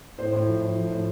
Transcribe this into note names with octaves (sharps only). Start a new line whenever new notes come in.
A2 C5
A2
F3
A2
F3
A2